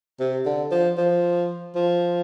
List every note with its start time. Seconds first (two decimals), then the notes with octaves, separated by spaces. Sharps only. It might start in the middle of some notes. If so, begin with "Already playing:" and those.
0.20 C3
0.46 D3
0.71 F3
0.98 F3
1.75 F3